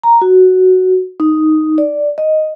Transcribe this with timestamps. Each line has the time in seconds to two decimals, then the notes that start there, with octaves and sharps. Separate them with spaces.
0.04 A#5
0.21 F#4
1.20 D#4
1.78 D5
2.18 D#5